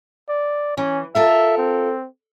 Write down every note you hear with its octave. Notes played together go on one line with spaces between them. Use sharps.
D5
E3 C#4
F4 A4 A#4 E5
C4